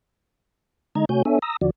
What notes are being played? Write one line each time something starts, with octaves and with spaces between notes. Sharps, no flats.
D3 G#3 D#4 D#5 A#5 G#6
C3 A3 F#4 C#5 G#5 G6
B3 D4 A4 C#5 E5 G#5
A#5 D#6 E6 A#6
E2 D3 F3 F#4 D5